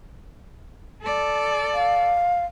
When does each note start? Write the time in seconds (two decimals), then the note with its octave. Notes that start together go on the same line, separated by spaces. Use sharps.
1.03 A4 D5
1.74 F5